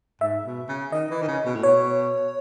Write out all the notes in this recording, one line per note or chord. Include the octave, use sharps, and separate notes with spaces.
G#2 E5
B2
C#3
D#3 D#5
E3
D#3
C#3
B2
A2
B2 C#5